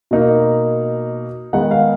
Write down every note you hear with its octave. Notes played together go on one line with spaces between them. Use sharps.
B2 A#3 D#4
D#3 G#3 B3 D#4 F#5
F5